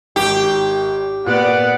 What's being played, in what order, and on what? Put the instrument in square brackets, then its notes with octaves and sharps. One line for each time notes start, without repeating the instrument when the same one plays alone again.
[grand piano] G#1 [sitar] G4
[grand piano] A#2 [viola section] B3 D5 [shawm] F#5